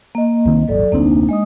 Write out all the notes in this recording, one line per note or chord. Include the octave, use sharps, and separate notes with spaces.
A#3 D#5
C2 D#3 C4
D#1 G#1 F#3 A4 D5
F1 D2 A#3 C4 D4 D#4
G#3 D#5 D#6